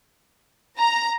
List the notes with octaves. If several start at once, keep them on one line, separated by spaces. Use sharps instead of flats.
A#5